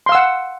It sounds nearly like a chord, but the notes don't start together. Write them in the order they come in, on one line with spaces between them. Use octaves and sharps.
C6 F5 E6 F#5